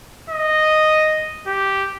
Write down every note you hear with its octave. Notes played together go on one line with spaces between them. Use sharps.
D#5
G4